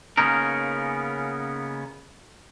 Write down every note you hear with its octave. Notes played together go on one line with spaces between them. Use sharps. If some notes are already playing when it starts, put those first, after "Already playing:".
C#3 A#3 B3 C#4 D#4 A#4